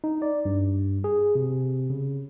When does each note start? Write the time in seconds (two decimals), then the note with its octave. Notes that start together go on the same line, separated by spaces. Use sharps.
0.04 D#4
0.22 D5
0.45 G2
1.04 G#4
1.35 C3
1.90 C#3